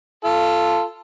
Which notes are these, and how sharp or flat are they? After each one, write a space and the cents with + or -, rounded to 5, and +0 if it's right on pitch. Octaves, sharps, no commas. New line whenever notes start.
F4 -15 A4 +0